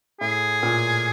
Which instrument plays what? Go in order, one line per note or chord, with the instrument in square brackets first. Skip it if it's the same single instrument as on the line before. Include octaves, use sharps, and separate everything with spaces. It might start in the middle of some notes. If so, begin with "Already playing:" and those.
[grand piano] A2 [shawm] G#4
[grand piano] A#2